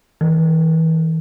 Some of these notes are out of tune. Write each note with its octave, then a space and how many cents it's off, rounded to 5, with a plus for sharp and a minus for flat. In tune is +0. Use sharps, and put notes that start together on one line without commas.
E3 -35